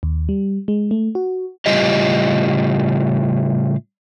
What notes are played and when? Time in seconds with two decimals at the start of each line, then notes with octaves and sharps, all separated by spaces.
0.03 D#2
0.29 G3
0.68 G#3
0.91 A3
1.15 F#4
1.66 A2 C#3 G3 F4 G4 D#5